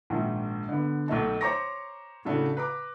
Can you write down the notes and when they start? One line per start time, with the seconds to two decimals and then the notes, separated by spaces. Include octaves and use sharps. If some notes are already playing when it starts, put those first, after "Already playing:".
0.10 A#1 G#2 D#3
0.69 D3 B3
1.08 B1 A3 D#4 A5
1.41 C5 C#5 A#5 C#6 D6 A#6
2.25 A2 C#3 A3 D4 F#4
2.57 B4 A#5 D6